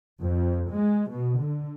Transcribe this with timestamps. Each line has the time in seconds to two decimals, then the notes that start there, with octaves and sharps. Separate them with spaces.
0.21 F2
0.71 G#3
1.10 B2
1.40 D3